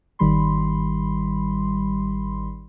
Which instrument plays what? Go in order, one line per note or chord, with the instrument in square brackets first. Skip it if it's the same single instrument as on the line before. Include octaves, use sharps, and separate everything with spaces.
[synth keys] G#1 D#3 G3 B5 C6